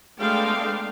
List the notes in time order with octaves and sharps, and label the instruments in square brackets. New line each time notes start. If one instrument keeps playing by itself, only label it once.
[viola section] G#3 A3 B3 D4 F5 G5